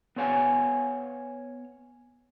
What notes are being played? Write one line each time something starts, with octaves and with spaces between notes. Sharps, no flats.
B3 D4 C#5 F5 G#5